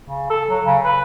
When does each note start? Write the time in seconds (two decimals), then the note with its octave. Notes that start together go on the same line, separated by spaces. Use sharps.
0.07 C#3
0.30 A4
0.49 F#3
0.66 C#3
0.84 B4